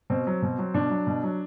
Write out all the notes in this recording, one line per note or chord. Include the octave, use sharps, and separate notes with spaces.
B2 C4
F#3
B2
F#3
B2 D4
F#3
B2
F#3